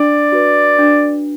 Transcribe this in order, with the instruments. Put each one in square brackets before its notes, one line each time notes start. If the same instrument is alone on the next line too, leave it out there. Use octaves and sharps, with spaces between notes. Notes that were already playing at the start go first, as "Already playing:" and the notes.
Already playing: [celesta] D4 [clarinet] D5
[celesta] F#4 B4
D4